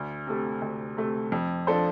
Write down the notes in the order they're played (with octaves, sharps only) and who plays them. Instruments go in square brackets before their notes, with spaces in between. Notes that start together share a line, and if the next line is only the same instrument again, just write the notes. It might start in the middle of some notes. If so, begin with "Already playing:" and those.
Already playing: [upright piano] D2
C3 A3
D2
C3 A3
F2
F3 D4 A4 C5